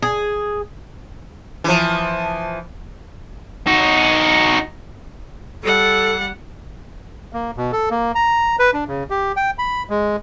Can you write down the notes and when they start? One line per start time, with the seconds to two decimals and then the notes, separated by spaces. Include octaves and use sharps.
0.02 G#4
1.64 E3 F3
3.67 D#4 F#4
5.63 G3 A4 F#5
7.33 A#3
7.57 B2
7.72 A4
7.91 A#3
8.15 A#5
8.59 B4
8.73 D4
8.88 C#3
9.10 G4
9.37 G5
9.59 B5
9.90 G#3